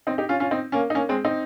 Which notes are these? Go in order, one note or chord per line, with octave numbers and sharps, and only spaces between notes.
C4 D#4
D#4 G4
C#4 F4
C#4 F4
C4 D#4
A#3 C#4
D#4
A#3 C#4
G#3 C4
C4 D#4